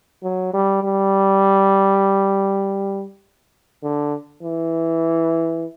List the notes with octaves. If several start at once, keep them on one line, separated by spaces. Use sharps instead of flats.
F#3
G3
G3
D3
E3